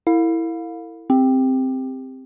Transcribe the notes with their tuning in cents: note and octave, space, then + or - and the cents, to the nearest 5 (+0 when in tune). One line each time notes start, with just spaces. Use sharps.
E4 +0 A4 +45 F5 +25
C4 +0 G4 +25